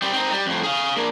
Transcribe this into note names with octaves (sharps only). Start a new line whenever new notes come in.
G3 C4
C4 D#4
G3
F2 A2
G#4 F5
A#3 D4